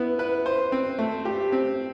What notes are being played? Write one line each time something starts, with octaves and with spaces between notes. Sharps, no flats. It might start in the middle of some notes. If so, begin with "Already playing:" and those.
Already playing: B3 E4
B4
C5
C4
A3
G4
C4